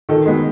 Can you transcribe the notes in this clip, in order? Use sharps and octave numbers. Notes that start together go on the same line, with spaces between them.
D#3 A4
G#3 B3